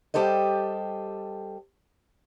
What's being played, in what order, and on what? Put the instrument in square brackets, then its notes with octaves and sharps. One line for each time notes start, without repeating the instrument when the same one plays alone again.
[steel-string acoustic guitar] G3 G4 A4 C5 D#5